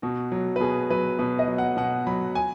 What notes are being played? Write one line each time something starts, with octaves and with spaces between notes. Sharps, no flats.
B2 F#4
F#3
B4
B2 G#4
F#3 B4
B2 B4
D#5
F#3
F#5
B2 F#5
F#3 B5
G#5